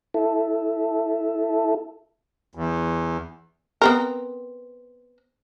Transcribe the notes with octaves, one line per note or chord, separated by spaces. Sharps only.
E4 A4
E2
B3 C4 A#4